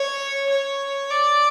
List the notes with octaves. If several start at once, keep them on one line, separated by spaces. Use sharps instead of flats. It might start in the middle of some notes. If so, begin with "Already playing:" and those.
Already playing: C#5
C#5
D5